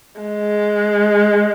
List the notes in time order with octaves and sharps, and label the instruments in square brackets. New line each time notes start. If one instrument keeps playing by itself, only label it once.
[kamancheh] G#3